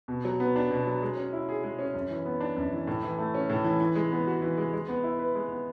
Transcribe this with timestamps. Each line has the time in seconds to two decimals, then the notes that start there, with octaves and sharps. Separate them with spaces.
0.08 B2
0.25 F#3
0.40 B3
0.56 D4
0.71 B2
0.87 F#3
1.02 G#3
1.17 C#4
1.33 E4
1.49 G#4
1.63 G#3
1.79 C#4
1.94 F#2
2.10 E3
2.25 B3
2.40 D4
2.57 F#2
2.72 E3
2.87 A2
3.03 E3
3.18 A3
3.34 C#4
3.50 A2
3.64 E3
3.80 E3
3.95 G#3
4.12 B3
4.27 F#4
4.42 E3
4.57 G#3
4.73 G#3
4.88 B3
5.04 E4
5.19 B4
5.35 G#3
5.51 B3